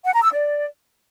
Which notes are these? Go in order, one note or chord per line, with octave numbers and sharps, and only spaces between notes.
F#5
A#5
E6
D5